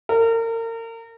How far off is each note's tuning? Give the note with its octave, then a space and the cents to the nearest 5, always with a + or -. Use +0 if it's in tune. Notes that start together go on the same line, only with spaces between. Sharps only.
A#4 -35